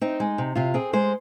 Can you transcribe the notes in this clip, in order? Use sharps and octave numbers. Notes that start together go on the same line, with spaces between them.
C4 D#4
G#3
C3
C3 F4
C4 G#4
G#3 C5